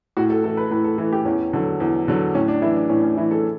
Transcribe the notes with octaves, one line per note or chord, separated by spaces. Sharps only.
A2 F#4
A4
E3 A4
B4
A2 B4
A4
E3 A4
G4
E2 C#4
D3 F#3
E2
D3 F#3
A2 C#4
D4
E3 E4
D4
A2 C#4
C#4
E3 E4
A4